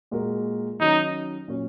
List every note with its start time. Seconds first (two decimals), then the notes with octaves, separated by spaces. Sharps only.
0.11 A#2 G#3 F#4 A#4
0.80 D#3 F#3 C#4 D#4
1.48 A#2 F#3 C#4